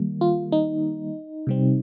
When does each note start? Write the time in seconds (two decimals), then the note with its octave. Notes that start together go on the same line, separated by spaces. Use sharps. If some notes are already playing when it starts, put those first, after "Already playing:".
Already playing: D#3 G3 A#3
0.21 F4
0.52 D#4
1.47 C3 G3 C4